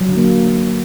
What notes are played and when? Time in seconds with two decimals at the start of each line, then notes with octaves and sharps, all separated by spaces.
0.01 F#3
0.09 D3
0.17 A#3